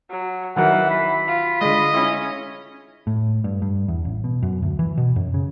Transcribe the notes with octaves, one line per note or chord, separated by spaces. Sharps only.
F#3
D#3 E3 F#3 A#4 F#5
B5
F4
D3 G#3 D#5
C#4 E4
A2
G2
G2
E2
A1
B2
F#2
D2
E3
B2
F#2
C#3